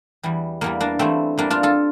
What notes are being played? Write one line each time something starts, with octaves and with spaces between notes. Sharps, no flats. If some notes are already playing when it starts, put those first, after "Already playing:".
E2 E3 G3
E2 E3 G3 A#3
A#3 D4
E2 E3 G3 A3 C4
E2 E3 G3 A#3 D4
D4 F4
F4 A4